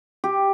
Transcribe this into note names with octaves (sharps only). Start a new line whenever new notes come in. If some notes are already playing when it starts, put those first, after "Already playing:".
G4